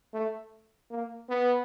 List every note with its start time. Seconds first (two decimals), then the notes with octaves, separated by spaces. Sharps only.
0.13 A3
0.90 A#3
1.29 B3